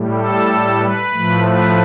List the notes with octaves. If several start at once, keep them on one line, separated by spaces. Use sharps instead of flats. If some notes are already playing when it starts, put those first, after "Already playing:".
Already playing: A2 G3
A4
B4
A2 F3 A3
B4